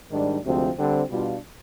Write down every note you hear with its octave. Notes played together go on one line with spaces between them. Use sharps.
G#2 D#3 G3 D4
D2 C3 F3 G#3 C4
D3 G3 C4
B2 G3 D4 F4